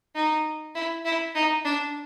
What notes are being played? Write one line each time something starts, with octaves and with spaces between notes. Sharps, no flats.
D#4
E4
E4
D#4
D4